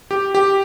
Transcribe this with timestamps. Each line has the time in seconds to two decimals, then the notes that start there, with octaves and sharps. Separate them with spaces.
0.11 G4
0.35 G4